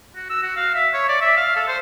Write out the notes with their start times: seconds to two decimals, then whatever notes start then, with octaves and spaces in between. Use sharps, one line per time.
0.15 F#4
0.30 E6
0.43 F#4
0.57 F5
0.75 E5
0.93 C#5
1.08 D5
1.22 E5
1.37 F5
1.56 A4
1.68 C5